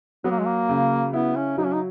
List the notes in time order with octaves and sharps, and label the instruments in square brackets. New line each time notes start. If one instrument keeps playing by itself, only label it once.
[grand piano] F#3 [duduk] B3
[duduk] A#3
G#3
A#3
[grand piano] C#3
[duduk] B3 [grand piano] E4
[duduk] C#4
[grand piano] F#3 [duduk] D#4
[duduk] C#4
D#4